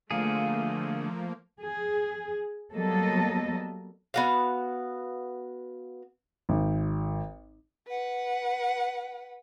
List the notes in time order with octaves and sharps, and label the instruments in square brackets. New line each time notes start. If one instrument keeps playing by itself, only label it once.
[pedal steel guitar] D3 G#4 [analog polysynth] F3 A#3 [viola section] A3 [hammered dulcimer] F5
[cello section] G#4
F#3 G3 A#3 B3 A4 D#5
[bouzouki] B3 F#4 F5
[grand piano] G#1
[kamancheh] B4 F#5